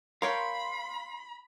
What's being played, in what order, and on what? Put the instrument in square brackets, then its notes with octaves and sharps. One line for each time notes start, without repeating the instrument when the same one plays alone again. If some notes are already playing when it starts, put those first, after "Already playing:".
[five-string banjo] A#4 C#5 G5 [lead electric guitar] F5 [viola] B5 [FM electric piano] C6